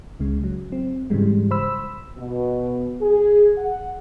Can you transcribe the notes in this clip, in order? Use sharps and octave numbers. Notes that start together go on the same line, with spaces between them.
C#2 C#3 G#3
F#3
C4
G#2 C#3 E3 G3 G#3
C5 B5 E6
B2
G#4
F#5